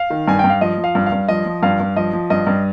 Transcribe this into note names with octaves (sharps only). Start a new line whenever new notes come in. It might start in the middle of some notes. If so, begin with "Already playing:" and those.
Already playing: F5
D#3
G2 G#5
G5
G2
F5
F3 D#5
F3
F5
G2
F5
G2
F3 D#5
F3
G2 F5
G2
F3 D#5
F3
G2 D#5
G2